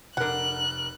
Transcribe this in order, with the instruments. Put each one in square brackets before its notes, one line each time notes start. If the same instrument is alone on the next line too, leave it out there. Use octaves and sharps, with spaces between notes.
[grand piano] F1 A#4 [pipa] D3 F#5 [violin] F#6